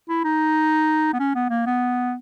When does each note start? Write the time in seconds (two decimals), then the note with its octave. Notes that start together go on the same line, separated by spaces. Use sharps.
0.09 E4
0.24 D#4
1.13 B3
1.19 C#4
1.35 B3
1.50 A#3
1.66 B3